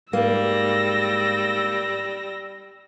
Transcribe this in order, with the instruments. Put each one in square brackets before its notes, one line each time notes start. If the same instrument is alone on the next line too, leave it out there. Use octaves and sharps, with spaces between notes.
[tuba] G#2 [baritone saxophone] G3 [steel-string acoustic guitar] A#3 [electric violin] E6 A#6